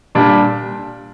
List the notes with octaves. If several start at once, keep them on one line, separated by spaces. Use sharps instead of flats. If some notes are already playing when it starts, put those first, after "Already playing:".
A#2 G3 D4